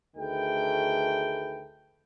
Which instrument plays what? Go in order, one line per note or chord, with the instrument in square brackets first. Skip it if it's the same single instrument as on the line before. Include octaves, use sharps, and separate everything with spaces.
[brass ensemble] D2 D#3 A3 G#4 B4 G5